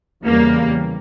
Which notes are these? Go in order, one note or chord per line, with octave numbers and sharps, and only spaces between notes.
E2 C#3 E3 G3 A#3